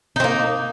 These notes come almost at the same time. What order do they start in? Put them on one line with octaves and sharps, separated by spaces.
D#4 C4 A#3